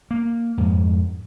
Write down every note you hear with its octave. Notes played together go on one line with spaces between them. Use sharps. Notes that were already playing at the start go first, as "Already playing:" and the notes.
A#3
F2 G#2